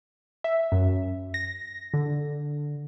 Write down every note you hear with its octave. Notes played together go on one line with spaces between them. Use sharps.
E5
F#2
A#6
D3